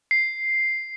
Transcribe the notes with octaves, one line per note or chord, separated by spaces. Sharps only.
C7